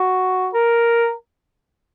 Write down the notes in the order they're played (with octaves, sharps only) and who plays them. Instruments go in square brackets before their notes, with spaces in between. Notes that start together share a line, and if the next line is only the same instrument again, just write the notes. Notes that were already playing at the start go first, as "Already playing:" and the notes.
Already playing: [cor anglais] F#4
A#4